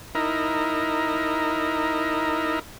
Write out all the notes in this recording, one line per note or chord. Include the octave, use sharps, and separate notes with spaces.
D#4 E4 A#4